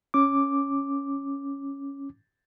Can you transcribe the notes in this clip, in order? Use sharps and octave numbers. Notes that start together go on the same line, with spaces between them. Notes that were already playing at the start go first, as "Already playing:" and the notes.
C#4 D6